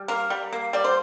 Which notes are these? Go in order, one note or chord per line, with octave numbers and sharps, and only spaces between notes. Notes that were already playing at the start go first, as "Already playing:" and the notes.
Already playing: G3
A#3 A#4
G3
A#3
G3 D5
C5